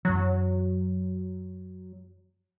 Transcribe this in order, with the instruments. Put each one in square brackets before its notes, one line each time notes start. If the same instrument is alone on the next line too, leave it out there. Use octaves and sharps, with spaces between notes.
[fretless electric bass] F#2 E3 [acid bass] F#3